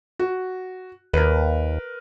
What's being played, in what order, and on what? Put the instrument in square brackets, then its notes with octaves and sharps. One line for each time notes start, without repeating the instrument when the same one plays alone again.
[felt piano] F#4
[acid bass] D#2 [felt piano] A#4 B4